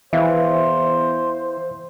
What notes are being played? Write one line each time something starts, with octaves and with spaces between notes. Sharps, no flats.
E2 E3 C5 E5 F5